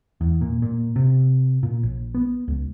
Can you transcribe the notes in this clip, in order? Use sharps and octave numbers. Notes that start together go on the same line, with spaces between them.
E2
A#2
A#2
C3
A#2
A#1
B3
C#2